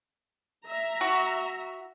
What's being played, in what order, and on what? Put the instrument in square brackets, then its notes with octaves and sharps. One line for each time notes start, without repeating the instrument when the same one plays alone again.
[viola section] E5 A#5
[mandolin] F#4